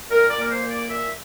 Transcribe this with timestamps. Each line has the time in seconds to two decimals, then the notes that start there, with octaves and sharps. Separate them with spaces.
0.10 A#2 A#4
0.29 D5
0.36 A#3 A#4
0.49 C5
0.62 A#2
0.69 D5
0.89 A#2 E5